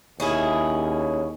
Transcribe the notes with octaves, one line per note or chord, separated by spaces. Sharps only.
D#2 C#4 E4 G#4